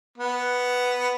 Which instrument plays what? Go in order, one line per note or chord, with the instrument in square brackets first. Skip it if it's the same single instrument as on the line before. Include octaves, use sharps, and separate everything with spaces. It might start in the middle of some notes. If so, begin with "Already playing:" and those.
[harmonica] B3